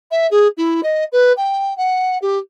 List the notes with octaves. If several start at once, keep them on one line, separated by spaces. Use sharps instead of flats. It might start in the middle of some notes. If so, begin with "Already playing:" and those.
E5
G#4
E4
D#5
B4
G5
F#5
G4